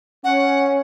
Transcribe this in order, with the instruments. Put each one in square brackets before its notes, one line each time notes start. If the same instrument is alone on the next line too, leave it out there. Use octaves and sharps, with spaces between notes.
[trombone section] C#4 [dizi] F#5